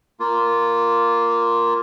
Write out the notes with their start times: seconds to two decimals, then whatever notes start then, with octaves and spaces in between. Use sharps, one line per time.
0.20 A#3 F4